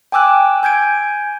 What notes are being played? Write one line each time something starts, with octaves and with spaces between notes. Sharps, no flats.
G5 G#5 D6 E6 F#6
G#5 G6 G#6 D7